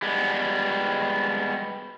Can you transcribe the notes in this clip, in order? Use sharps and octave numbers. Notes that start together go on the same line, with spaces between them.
G3 G#3 B3